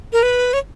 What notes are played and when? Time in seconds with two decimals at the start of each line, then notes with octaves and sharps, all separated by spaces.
0.13 A#4
0.23 B4
0.53 C#5